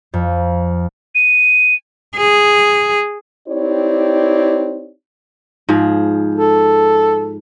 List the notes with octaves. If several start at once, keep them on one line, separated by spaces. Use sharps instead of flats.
F2
D#7
G#4
C4 D#4 E4 G4 C#5 D5
G#2 F3 G#4
A4